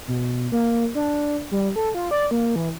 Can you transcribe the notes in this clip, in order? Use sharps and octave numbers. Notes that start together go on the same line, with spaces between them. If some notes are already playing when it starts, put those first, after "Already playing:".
B2
A#3
D4
G3
A4
F4
D5
A#3
E3